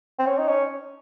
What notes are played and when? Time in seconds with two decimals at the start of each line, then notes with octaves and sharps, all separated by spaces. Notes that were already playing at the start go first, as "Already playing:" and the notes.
0.19 C4
0.26 C#4
0.38 D#4
0.48 C#4